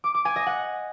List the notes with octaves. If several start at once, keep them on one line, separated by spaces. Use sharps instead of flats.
D6
D6
G#5
D#5
F#5